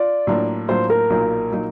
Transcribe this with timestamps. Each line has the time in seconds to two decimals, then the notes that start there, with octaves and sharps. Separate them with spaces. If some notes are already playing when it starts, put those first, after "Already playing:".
Already playing: F4 D5
0.27 A2 F#3 A#3 D4 F4
0.68 A2 F#3 A#3 D4 F4 C5
0.90 A#4
1.10 B1 A#2 F#3 A#3 D#4
1.52 A#2 F#3 A#3 D#4